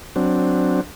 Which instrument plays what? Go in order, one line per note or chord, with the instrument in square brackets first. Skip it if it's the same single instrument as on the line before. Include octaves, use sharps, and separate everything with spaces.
[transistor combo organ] F#3 C4 D4